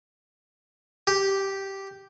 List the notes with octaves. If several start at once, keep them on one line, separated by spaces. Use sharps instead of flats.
G4